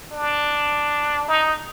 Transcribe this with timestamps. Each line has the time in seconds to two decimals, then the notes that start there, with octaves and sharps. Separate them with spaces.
0.12 D4
1.28 D#4